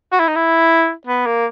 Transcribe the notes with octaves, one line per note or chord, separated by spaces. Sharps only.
F#4
E4
D#4
E4
B3
A#3